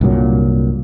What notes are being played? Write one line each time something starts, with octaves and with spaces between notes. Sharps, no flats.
C2 G2 A#2 F#3